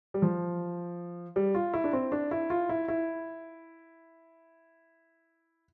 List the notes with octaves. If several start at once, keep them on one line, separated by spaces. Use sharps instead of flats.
G3
F3
G3
F4
E4
D4
C4
D4
E4
F4
E4
E4